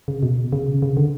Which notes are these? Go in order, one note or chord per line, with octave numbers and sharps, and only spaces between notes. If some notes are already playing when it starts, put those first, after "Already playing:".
C#3
B2
C#3
C#3
D3